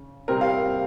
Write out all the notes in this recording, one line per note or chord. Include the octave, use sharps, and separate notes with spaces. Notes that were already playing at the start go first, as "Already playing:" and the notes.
Already playing: C#3
C3 G3 C4 A#4
F5